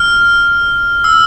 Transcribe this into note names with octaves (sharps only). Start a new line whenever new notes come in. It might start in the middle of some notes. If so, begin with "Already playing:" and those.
Already playing: F6
E6